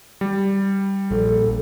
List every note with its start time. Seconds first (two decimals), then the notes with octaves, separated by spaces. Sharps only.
0.21 G3
1.11 A#1 A4